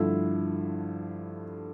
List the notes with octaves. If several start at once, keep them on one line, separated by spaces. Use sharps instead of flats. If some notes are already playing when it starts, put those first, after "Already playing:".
Already playing: G2 D3 F3 A3 E4